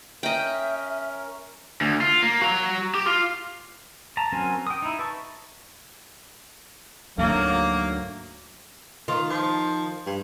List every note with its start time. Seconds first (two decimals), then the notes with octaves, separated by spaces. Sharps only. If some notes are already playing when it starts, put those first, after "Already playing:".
0.23 C#4 A#4 D#5 E5 G5
1.81 D2
2.01 F4
2.22 A#3
2.42 F#4 A#5
2.95 G4
3.07 F4
4.17 A5 A#5
4.32 F#3 C4 C#4 A#4 G#5
4.67 G5 D#6
4.82 D#4 E4
4.99 B4 A5 C#6
7.18 D2 G#2 F#3 A#3
9.08 D#3 F4
9.30 F3
10.06 G2